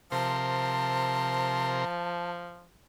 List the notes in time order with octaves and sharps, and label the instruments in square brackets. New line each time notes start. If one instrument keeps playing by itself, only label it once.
[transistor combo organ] C3 A#4 C6 [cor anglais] F3 [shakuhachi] A5